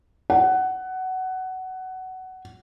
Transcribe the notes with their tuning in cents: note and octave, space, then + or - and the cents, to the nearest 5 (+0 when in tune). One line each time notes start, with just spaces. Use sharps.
F#5 +15